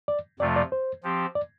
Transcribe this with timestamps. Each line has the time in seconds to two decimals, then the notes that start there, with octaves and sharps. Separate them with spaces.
0.08 D5
0.39 F2 C3 F3 A3 F4 D5
0.56 D5
0.72 C5
1.03 F3 C4 G4
1.35 D5